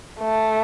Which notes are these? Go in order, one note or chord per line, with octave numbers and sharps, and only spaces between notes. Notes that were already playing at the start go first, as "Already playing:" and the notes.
A3